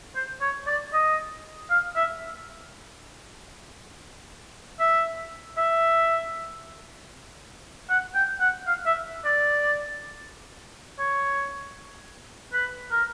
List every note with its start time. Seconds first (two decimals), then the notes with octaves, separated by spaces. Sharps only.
0.16 C5
0.41 C#5
0.67 D5
0.93 D#5
1.70 F5
1.96 E5
4.80 E5
5.57 E5
7.90 F#5
8.14 G5
8.41 F#5
8.67 F5
8.86 E5
9.25 D5
10.99 C#5
12.53 B4
12.91 A#4